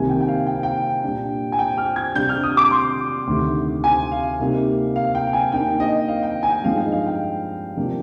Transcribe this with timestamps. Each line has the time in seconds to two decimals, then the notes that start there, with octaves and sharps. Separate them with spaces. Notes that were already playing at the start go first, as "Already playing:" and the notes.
Already playing: C2 C3 D#3 A#3 G#5
0.09 G5
0.21 G5
0.28 F5
0.47 G5
0.55 F5
0.63 G5
1.04 A#2 G3 D4
1.52 G#5
1.59 G5
1.78 F6
1.96 G#6
2.15 C3 G3 D4 G6
2.29 F6
2.43 D#6
2.57 D6
2.71 C6
3.27 D2 C3 D#3
3.84 G#5
4.12 F5
4.39 C3 G3 A#3 D#4
4.96 F5
5.15 G5
5.33 G#5
5.52 D#2 D#3 A#3 D4 G5
5.80 D#5
6.08 F5
6.23 G5
6.43 G#5
6.50 G5
6.64 G2 F3 G#3 D#4 F5
6.78 D#5
6.92 F5
7.07 G5
7.76 C3 F3 A#3 D4